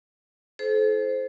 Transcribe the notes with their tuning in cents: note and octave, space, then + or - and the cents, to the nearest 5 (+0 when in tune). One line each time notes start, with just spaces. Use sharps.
E4 +0 A4 -40 C5 +0